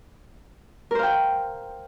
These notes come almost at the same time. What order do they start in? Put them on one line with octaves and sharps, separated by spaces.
A#4 C5 F5 G5